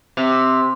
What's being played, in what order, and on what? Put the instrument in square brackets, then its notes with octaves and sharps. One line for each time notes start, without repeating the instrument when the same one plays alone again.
[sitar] C3